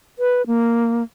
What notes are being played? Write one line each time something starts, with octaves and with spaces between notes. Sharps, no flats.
B4
A#3